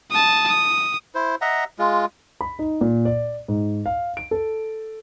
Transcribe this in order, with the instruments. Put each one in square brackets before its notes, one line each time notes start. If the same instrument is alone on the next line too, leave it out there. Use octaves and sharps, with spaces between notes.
[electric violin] A5 D#6
D#6
[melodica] E4 C5
D#5 E5 F#5 A#5
G#3 F4
[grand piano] B5
D#4
A#2
D5
G#2
F5
D7
A4